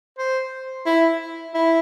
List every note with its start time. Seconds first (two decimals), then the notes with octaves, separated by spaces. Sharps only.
0.18 C5
0.86 E4
1.54 E4